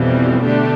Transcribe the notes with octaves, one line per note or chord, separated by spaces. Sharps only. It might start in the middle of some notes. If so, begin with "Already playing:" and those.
Already playing: F2 B2 E3 G3 C4
D3 A3 D4 G4